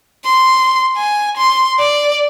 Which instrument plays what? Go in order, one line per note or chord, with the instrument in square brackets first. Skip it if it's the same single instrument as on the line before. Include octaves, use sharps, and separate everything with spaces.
[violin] C6
G#5
C6
D5